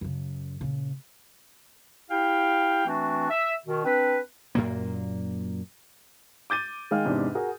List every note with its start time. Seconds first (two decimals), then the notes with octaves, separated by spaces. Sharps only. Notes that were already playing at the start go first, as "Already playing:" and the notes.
0.01 F#2 C#3
0.61 A#2 C#3
2.11 E4 G4 F5 G5
2.86 E3 A3 C4 D4 F#4
3.30 E5
3.66 B2 D#3
3.85 C4 D4 B4
4.55 F#2 A#2 A#3
6.50 D6 G6 A6 D#7
6.91 D#3 G#3 F5 G5 F6
7.05 E2 G#2 C3 E3 D4
7.35 F#4 G#4 A#4 F#5